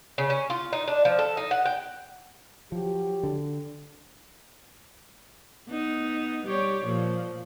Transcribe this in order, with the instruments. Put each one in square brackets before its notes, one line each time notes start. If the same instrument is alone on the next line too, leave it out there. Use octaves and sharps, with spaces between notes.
[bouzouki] C#3
C#4
F4
D#4
D4
F3
A4
D#4
F#5
G5
[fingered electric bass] F3 [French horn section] F#3 G4
[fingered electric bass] D3
[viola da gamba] B3 D#4
G3 G4 C#5
A#2 F3